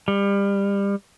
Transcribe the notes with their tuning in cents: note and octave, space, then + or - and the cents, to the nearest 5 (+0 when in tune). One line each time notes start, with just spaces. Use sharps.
G3 +30